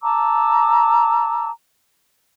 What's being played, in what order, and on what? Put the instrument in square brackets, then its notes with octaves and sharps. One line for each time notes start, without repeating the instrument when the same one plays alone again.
[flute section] A5 A#5 D6 E6